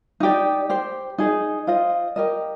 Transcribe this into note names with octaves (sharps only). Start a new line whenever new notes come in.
D#4 G4 D5
G4 C5 G5
D#4 G#4 D#5
F4 C5 D#5
G4 A#4 D#5